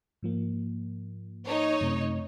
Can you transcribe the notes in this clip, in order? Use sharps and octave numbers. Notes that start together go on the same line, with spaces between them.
G#2 F3 A#3
D#4 C#5
F#2 C3 A3